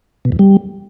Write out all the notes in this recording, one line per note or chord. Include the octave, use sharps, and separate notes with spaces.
B2
E2
G3